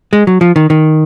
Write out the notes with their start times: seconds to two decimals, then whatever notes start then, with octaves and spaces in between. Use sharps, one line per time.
0.13 G#3
0.27 F#3
0.41 F3
0.56 D#3
0.70 D#3